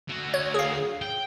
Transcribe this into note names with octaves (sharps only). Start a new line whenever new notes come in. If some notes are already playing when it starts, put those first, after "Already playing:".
D3 F#4
C#5
G#4 F5
G5